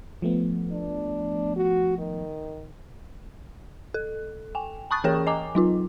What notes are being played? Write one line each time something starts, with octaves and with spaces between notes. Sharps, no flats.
F3 A3 B3
D4
F#4
D#3
A4
G5 G#5
A5 B5 C#6 D#6 F#6 A6
E3 C#4 G#4 A#4 C#5 G5
D#5 G#5 A#5 D6
F#3 D#4 F4